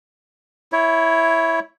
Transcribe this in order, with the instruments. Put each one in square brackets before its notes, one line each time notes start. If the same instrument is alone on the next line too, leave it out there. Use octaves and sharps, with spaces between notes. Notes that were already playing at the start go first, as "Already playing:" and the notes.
[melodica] E4 C#5